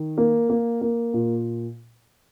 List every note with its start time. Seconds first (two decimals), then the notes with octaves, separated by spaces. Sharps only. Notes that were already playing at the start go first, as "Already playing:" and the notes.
Already playing: D#3
0.18 A#3
0.50 A#3
0.81 A#3
1.14 A#2